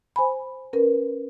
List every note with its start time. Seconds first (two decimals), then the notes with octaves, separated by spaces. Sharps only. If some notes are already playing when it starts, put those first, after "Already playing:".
0.16 C5 G#5 B5
0.73 C#4 A#4 B4